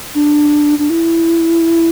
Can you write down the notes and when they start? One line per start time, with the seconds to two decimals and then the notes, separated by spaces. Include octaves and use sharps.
0.15 D4
0.79 D4
0.90 E4